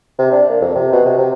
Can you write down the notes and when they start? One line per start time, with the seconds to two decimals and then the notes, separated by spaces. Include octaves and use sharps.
0.19 C3
0.32 D4
0.49 A#3
0.61 F2
0.75 C3
0.92 B2
1.05 C3
1.18 C3